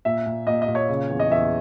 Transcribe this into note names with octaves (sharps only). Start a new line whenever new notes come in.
A#2 E5
A#2
A#2 D#5
D#5
A#2
C#5
C#3
E2
D#5
E2 E5